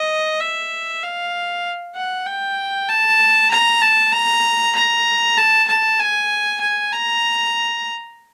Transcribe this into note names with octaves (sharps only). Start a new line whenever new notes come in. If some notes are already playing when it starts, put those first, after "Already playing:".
Already playing: D#5
E5
F5
F#5
G5
A5
A#5
A5
A#5
A#5
A5
A5
G#5
G#5
A#5